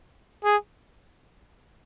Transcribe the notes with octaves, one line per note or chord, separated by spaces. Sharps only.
G#4